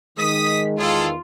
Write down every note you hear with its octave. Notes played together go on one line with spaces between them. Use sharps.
D#3 G#3 D#6 B6
E2 D#3 F4 G#4 A4